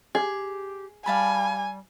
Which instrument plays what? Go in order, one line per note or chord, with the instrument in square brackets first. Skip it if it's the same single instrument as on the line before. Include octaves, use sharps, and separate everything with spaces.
[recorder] G4 [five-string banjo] G#4
[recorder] G3 [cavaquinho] F5 A5 B5 [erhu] G#5